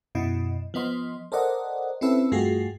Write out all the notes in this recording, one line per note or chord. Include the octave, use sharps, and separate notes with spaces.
F#2 B2 E4 D#5
F3 B3 D#5 C6
A4 A#4 C5 D5 D#5 F#5
C4 C#4 E4 A4 B4 E5
G2 A3 F4 F#4 G#4 C7